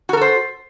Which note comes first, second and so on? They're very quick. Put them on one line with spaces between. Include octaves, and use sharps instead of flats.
F#4 A#4 A4 C5